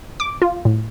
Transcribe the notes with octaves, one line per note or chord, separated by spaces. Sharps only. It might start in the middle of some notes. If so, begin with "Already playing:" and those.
D6
F4
A2